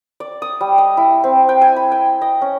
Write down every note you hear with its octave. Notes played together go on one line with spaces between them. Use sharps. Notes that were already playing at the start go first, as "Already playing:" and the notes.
D5
D#6
G3
D#5
E4
C4
G5
G#5
B5
G5
D#5
C#4